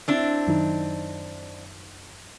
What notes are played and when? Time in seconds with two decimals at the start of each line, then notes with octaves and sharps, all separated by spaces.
0.08 C4 D4 E4
0.47 F#2 D#3 D#4